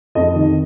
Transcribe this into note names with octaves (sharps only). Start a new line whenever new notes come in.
F2 D#5
D#3